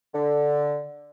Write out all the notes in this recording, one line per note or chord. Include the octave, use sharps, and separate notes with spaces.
D3